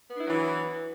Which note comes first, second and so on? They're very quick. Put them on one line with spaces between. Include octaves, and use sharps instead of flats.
B3 D4 E4 F#3 E3